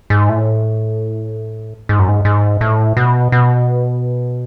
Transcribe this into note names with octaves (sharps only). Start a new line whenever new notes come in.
G#2
A2
G#2
F#2
G#2
G#2
A2
B2
B2